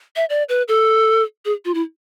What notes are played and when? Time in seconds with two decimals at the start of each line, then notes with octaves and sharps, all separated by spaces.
0.16 E5
0.30 D5
0.49 B4
0.68 A4
1.45 G#4
1.65 F4
1.74 E4